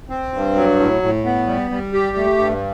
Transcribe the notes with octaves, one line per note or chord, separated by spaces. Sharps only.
C4
G2
F#3
A2
A2
B3
G3
G3
G4
A3
G2